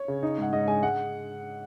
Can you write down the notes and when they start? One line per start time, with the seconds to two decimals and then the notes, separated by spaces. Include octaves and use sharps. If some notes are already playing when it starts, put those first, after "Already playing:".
Already playing: C#5
0.08 C#3
0.23 D#4
0.38 G#2 F#5
0.53 G#2 D#5
0.68 G#3 G#5
0.83 G#3 F#5